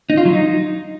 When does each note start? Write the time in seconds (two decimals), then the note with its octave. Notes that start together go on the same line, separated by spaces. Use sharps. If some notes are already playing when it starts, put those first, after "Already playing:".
0.10 D#4
0.17 F4
0.25 F#3
0.33 D#4